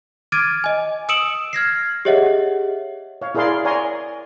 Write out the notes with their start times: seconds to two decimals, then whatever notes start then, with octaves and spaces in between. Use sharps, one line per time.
0.32 D6 F6 G#6 A6 D7 D#7
0.64 D#5 G#5
1.09 D#6 E6 C#7 D7 E7 F#7
1.53 F6 G#6 A#6 C7
2.05 G4 G#4 C#5 D#5 E5 F#5
3.22 C#5 F5
3.35 E4 G#4 A#4 D5 F5 C6
3.65 C#5 D5 G#5 A#5 C6